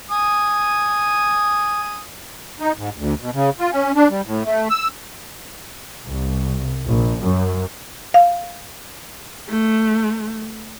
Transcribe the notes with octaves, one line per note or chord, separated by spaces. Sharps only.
G#5 D#6
D#4
G#2
D2
B2
C#3
F4
C#4
D4
G3
A2
A3
E6
C2
A#1
F#2
F5
A3